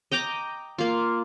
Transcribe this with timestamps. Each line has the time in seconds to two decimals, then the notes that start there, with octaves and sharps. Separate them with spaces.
0.12 D#5 G5 A#5 D6
0.78 A#3 F4